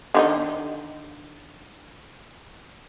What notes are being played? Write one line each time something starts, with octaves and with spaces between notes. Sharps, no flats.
D3 D#3 D#4